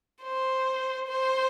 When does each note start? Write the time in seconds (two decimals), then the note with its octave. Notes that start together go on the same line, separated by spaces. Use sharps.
0.23 C5
1.08 C5